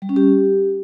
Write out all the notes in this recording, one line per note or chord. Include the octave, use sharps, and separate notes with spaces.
G3
C#4
G4